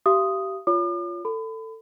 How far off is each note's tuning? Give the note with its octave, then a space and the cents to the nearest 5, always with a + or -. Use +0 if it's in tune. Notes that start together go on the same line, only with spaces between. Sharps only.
G4 -25 F5 -40 D#6 +0
F4 +0 C#5 +25 D6 +45
A4 +20 B5 +35